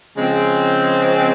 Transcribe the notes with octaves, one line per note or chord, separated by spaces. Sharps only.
C#3 F3 G#3 C4